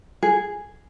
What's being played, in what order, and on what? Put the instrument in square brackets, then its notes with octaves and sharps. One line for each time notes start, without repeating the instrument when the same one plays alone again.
[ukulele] G#4